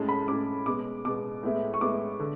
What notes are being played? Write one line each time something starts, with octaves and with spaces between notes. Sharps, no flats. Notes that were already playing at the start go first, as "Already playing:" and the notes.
Already playing: A2 G#3 C#4 A5
B5
A2 G#3 C#4 D6
B2 G#3 B3 D6
B2 G#3 B3 D6
A2 G#3 B3 E4
C#6
A2 G#3 B3 E4 D6
D3